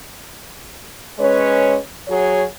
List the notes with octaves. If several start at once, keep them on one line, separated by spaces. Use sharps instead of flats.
G#3 C#4 B4 C#5
F#3 F#4 G#4 C#5